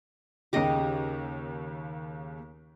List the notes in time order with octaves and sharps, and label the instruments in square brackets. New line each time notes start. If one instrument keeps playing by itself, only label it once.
[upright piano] D#2 C#3 [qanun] G4 D#5